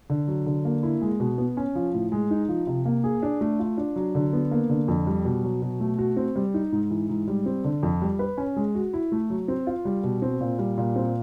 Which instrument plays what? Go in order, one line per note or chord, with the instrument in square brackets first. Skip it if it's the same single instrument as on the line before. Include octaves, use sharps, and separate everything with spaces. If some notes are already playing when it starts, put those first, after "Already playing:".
[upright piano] D3
F#3
D3
A#3
E4
G#3
B2
B3
C#4
F3
A2
G#3
D#4
F3
C3
A#3
G#4
D4
A3
F4
D4
F#3
D3
B3
A#3
D3
F2
G3
B2
F#3
B2
A3
F#4
C4
G3
D#4
G#2
E3
G#2
G3
C4
D3
F2
G3
B4
C#4
G#3
F#4
E4
A3
F#3
C4
F4
G3
B2
C4
A#2
G3
A#2
C4